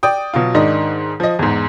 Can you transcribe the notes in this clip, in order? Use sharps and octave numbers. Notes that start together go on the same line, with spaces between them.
D5 G5 D#6
B2 F#3 F4
G#2 D#3 D4 D#5
F3 D#5
E2 G#2